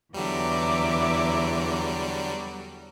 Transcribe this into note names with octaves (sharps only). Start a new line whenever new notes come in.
E2 D3 F#3 G3 E5 A#5 D6